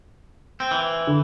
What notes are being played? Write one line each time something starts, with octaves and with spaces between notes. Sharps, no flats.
C4
E3
D3